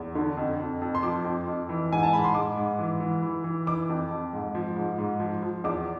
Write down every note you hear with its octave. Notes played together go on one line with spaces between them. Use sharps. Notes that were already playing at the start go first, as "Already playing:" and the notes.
Already playing: E2
D3
F2
F2
F2
C6
F3 D6
F2
F2
E3
G#2 G#5
A5
G#2 B5
C6
G#2 D6
G#2
E3
E3
E3
E3
E3 D6
F2
F2
G#2
F3
G#2
G#2
F3
F3
E2 D6